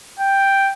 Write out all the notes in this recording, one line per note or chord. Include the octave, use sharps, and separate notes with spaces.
G5